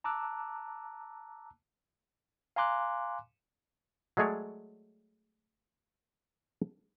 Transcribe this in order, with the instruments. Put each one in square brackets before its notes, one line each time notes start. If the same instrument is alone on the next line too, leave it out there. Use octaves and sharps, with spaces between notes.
[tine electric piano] A5 A#5 D6 E6 F#6
F5 G#5 A#5 C6 D6 F#6
[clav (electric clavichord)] F#3 G#3 A3 G#4 C#5 D5